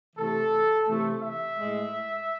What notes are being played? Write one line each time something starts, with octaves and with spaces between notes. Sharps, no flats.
C3 E3 A3 A4
C3 E3 A3
E5
A2 G#3